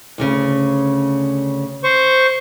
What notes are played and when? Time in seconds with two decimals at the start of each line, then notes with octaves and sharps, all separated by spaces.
0.18 D2 A2 C#3
1.84 C5 C#6